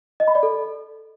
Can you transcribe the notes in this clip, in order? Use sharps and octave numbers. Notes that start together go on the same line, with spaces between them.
D#5
B5
D5
A4